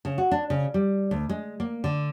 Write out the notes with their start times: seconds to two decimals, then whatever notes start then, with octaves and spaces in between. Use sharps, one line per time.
0.05 C#3
0.18 F#4
0.31 D4
0.50 C#3
0.74 G3
1.11 D2
1.29 G#3
1.60 A#3
1.84 D3